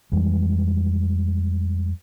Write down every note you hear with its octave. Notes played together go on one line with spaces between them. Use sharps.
F2 E3 G3 G#3